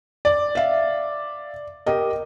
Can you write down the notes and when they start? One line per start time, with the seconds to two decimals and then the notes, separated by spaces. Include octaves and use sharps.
0.25 D5
0.55 E5 F5
1.86 G4 A#4 D#5